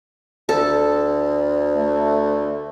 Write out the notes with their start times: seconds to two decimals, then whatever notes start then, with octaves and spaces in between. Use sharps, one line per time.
0.49 D2 A4
1.76 A3